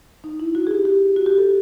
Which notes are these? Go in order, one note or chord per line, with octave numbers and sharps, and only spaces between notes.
D#4
E4
F#4
G#4
G4
G4
F#4
G4
A4